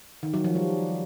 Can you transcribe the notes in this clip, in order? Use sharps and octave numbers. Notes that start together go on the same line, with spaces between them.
D#3
F#3
F3
G3